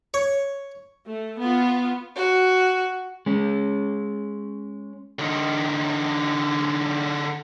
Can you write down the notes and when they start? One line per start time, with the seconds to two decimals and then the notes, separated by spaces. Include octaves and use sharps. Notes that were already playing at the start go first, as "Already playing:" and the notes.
0.14 C#5
1.06 A3
1.38 B3 F4
2.16 F#4
3.26 G#3 C#4
5.19 D3 D#4